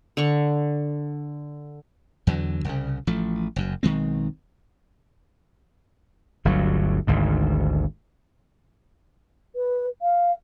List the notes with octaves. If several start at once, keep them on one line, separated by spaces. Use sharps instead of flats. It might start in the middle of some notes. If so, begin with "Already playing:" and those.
D3 C#6
E2 D3 F#3
C2 C#3
A1 F3 A3
F#1 F#2
B1 D#3 G#3 C4
G1 D2 F#3
G#1 D2 G#2
B4
F5